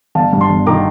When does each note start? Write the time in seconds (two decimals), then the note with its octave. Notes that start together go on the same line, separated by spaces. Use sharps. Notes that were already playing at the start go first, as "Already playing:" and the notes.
0.15 G1 F5 A5
0.33 G2
0.41 A5 C6
0.50 G1
0.66 D#3 A#5 D6